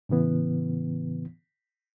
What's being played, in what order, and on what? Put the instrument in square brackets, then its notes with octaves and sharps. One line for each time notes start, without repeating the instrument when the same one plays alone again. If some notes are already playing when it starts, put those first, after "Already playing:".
[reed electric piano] A2 C#3 E3 B3